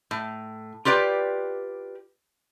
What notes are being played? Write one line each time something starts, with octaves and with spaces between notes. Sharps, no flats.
A2
F4 G4 B4 D5 G5